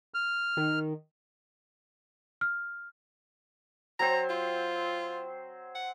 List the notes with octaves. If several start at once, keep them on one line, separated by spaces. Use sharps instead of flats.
F6
D#3
F6
F#3 C4 C5 A#5
F4
F#5